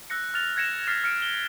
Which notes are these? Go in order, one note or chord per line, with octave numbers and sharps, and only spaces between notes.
E6 F#6 A#6 C#7
F6 F#6 A6 F7
F#6 G#6 A#6 C#7 E7 F7
F6 A6 B6 C7 E7
F6 C#7 D7
G7